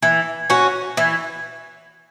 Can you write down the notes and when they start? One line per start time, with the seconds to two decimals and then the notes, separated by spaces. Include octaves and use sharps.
0.02 E3
0.50 C#4 F#4
0.97 E3